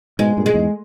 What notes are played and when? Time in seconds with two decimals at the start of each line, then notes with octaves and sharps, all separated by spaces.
0.19 G#2 B2 G#3
0.37 G2 A#2
0.46 G#3
0.54 E2 G#2